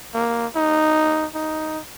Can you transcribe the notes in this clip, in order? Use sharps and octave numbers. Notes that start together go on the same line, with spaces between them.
A#3
D#4
D#4